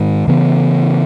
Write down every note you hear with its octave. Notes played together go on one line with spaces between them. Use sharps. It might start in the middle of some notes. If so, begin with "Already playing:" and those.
Already playing: G#2 D#3 G#3
C#3 E3 B3